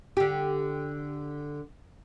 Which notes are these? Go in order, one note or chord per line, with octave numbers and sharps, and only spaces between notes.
D3 G4